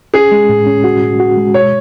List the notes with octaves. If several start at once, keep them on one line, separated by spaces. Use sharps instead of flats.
C#4 G#4
G#3
A2
C#4
F#4
A2
F#4
G#3
B2 C#5